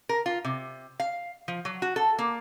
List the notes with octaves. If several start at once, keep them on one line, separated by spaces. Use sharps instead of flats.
A#4
F4
C3
F5
F3
F#3
F#4
A4
A#3